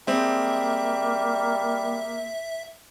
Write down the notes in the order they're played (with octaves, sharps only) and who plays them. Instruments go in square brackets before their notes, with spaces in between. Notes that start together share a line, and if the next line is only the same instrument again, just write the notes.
[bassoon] G3 [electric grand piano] G#3 C4 [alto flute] A#3 [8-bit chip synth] E5